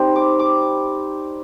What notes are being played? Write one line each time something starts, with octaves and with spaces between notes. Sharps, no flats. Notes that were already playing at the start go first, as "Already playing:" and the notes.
Already playing: G3 C4 D#4
D6
D6